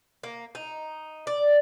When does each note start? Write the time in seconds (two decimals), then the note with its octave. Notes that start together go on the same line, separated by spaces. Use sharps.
0.23 A#3
0.55 D#4
1.27 D5